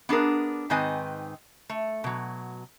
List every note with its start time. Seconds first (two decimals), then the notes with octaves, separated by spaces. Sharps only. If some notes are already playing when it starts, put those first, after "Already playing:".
0.09 B3 D4 G#4 A#4
0.70 G#2 D#3 C4 B4 D#5 G#5
1.70 A3
2.04 B2 F#3